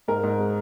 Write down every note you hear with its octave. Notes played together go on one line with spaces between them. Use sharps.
G#2 A#4
G#2
G#3